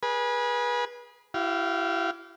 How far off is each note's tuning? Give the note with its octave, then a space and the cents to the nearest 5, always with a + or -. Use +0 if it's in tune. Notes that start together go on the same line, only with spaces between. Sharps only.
G#4 +0 B4 -30
E4 +30 G4 -35 F5 +0